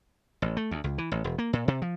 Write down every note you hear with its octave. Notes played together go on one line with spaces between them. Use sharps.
A1
A3
D2
C#2
E3
A1
E1
A#3
A#2
C3
F3